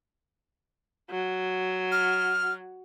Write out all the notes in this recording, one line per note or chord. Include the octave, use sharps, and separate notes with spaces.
F#3
F6